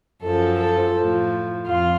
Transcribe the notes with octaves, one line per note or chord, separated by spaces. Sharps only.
F#2 F3 A4
A4
A2 F3
F2 F4